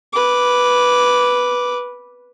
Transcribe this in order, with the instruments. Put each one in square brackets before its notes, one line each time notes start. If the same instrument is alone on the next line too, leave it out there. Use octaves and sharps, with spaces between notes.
[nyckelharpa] B4 D6